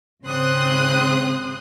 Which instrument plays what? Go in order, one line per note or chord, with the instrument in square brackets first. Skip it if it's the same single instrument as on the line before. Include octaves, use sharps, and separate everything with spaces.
[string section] G#1 C#3 C4 C6 D#6 F#6